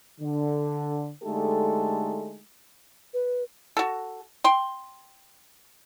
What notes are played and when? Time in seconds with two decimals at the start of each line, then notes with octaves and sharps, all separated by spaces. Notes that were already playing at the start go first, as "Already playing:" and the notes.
0.20 D3
1.23 D3 G#3 A3 D#4 G4 A4
3.14 B4
3.77 F#4 A4
4.44 G5 C6